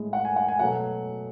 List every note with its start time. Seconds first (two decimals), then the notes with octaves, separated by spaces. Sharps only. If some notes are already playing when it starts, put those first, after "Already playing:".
Already playing: A2 G#3
0.13 F#5
0.25 G#5
0.36 F#5
0.48 G#5
0.59 B2 F#3 A3 F#5